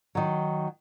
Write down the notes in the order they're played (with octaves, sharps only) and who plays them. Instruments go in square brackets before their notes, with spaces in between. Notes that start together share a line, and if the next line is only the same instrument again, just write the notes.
[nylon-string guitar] D#3 F#3